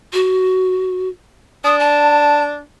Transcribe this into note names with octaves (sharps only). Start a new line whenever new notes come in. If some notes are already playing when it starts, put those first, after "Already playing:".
F#4
D4 D#6
A5